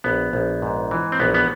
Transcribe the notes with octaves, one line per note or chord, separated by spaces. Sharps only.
A#1 B3
A#1
G#2
E3
C4
A#1 B3
B3